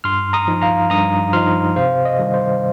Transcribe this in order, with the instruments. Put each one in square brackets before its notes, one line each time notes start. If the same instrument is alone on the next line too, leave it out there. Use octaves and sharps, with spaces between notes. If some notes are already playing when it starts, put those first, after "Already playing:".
[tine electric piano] G2 C6 F6
A#5 D#6
F3 D#4
F5 A#5
G2 A#5 D#6
F3 D#4 C6 F6
C3 C5 F5
D#5
D#3 G3
C5